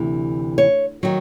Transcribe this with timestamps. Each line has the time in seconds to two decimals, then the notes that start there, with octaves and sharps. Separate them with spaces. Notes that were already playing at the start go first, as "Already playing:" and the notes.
Already playing: D2 C3 E3
0.58 C#5
1.03 D#3 F#3